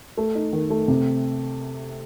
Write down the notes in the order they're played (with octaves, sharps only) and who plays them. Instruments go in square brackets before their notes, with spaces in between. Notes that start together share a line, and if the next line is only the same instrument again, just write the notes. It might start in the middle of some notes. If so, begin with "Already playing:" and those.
[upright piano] A3
D#4
D#3
A3
C3